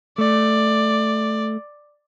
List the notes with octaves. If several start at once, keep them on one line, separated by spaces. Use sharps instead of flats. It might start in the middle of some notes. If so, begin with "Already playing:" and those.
A3 D5